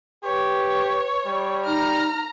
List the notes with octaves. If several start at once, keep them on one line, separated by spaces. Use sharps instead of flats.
G4 B4 C#5
G3
D#4 A#5 F6